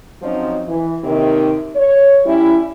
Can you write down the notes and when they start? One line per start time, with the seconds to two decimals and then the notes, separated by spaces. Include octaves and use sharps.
0.22 F3 F#3 C4 C#4 D#4
0.67 E3
1.03 D#2 C3 D#3
1.76 C#5
2.25 G3 C#4 E4